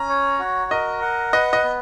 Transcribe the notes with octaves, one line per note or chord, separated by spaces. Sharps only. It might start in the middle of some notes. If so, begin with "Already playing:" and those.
Already playing: C#4 A#5
C#5
F#4
A#4 D#5
F#5
B4 D#5
D#5
B3